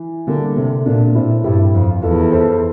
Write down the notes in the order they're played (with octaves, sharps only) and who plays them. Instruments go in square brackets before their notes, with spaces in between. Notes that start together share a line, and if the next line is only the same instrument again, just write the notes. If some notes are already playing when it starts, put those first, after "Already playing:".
Already playing: [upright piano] E3
[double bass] D3 [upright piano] G3 A#3
[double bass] C3 [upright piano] A3 C4
[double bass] A#2 [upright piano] A#3 D4
[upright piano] D4
[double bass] A2 [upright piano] C4 E4
[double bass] G2 [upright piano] E4 G4
[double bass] F2
[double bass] E2 [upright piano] F4 A4
[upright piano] A4 C5